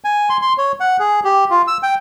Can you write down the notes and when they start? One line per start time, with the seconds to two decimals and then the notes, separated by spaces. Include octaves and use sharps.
0.04 G#5
0.30 C6
0.42 C6
0.58 C#5
0.80 F#5
0.99 G#4
1.24 G4
1.50 F4
1.67 E6
1.83 G5